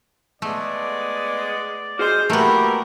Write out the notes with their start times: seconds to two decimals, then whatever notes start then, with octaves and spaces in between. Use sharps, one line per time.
0.42 G#3 A3 B3 D5
1.99 F#4 G#4 C5 D#5 F6
2.30 A#2 E3 A3 B3 F#4 G4 A#4 A#5